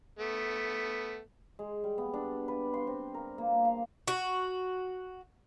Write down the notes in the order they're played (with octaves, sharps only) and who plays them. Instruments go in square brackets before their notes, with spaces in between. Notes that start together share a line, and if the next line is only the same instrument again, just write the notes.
[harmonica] A3 B3
[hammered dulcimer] G#3
G3
B3
D4
B4
C6
C4
A#4
A#3
F5
[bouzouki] F#4